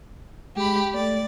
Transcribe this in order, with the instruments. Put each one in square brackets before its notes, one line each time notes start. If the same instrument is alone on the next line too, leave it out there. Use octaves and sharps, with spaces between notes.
[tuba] G#3 [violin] G4 B5
[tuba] A3 [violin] D5